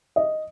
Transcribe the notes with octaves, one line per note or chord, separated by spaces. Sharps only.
D#5